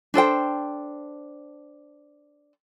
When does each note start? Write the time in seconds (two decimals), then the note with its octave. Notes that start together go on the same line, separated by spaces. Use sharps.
0.14 D4 A4 C5 G5